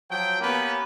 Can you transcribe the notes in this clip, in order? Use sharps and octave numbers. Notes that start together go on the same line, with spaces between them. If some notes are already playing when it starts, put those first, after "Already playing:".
F3 F#3 G5
A#3 B3 C#4 G4 B4